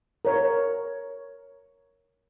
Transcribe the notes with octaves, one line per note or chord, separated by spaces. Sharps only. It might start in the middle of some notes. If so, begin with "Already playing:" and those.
A#4 C#5